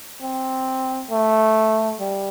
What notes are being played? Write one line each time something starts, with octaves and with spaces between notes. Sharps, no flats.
C4
A3
G3